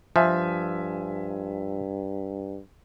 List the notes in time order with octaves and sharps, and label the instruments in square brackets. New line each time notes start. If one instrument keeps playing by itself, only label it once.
[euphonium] G2 [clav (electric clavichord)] F3 [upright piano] E5 G#5